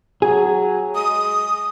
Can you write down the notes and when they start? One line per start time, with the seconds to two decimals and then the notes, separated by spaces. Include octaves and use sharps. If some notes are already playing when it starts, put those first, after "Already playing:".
0.22 F#3 G#4
0.95 G#3 D#6